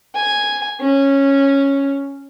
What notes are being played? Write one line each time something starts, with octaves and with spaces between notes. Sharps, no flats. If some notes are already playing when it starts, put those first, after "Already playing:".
G#5
C#4